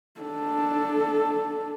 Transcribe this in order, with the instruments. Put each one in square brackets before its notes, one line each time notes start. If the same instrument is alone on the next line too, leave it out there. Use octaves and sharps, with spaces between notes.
[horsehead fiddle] D4 A4